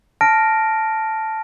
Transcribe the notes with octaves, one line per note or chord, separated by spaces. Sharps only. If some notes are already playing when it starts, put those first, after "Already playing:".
A5 F6 A#6 D7